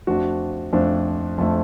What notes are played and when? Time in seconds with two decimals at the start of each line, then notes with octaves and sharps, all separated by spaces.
0.07 F2 F3 A3 D4 F#4
0.73 F2 F3 A3 D4
1.38 F2 F3 A3 D4